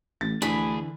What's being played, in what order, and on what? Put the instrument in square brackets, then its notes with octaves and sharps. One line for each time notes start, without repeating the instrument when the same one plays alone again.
[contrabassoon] A1 [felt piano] A6
[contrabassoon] D2 [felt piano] D3 E3 [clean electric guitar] D4 G#4 [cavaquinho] B5